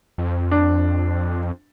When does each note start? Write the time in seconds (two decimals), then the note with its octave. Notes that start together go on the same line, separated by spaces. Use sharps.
0.18 F2
0.51 D4